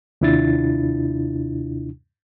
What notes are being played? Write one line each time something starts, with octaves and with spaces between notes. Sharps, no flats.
D#2 C3 D4 E4 F4 A6